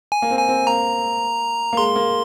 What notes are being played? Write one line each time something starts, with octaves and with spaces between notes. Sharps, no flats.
G#5
A#3
C4
G#5
C4
A#3 A#5
A#3
G#3 C6
A#3